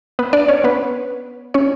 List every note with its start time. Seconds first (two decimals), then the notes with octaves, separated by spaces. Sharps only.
0.19 B3 B4
0.33 D4 D5
0.48 C#4 C#5
0.64 B3 B4
1.54 C#4 C#5